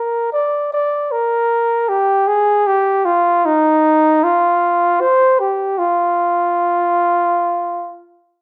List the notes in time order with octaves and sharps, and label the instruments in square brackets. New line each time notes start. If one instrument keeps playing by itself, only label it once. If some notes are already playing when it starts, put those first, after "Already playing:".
Already playing: [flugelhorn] A#4
D5
D5
A#4
G4
G#4
G4
F4
D#4
F4
C5
G4
F4